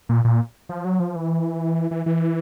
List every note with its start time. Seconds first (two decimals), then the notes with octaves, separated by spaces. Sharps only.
0.09 A#2
0.25 A#2
0.69 F3
0.85 F#3
1.00 F3
1.16 E3
1.91 E3
2.06 E3